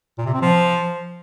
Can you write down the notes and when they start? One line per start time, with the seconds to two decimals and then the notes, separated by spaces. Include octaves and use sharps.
0.18 A#2
0.26 C3
0.34 C4
0.41 F3